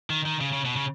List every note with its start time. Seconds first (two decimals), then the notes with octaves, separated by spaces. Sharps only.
0.10 D#3
0.25 D#3
0.41 C#3
0.53 C#3
0.65 B2
0.76 C#3